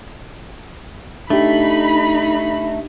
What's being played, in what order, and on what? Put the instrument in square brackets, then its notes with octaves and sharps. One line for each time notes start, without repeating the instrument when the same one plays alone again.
[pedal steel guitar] A3 [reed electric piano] D4 G4 [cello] D#4 [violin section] B5